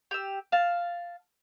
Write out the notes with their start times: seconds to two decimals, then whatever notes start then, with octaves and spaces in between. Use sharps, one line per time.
0.11 G4 E6
0.52 F5 A5